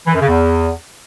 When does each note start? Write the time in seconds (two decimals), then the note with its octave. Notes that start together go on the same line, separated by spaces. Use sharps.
0.07 E3
0.14 F#2
0.21 C#3
0.28 E2